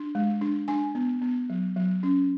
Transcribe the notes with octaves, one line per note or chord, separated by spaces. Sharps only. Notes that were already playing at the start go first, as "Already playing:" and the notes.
Already playing: D4
G#3
D4
D4 G#5
B3
B3
F#3
F#3
C#4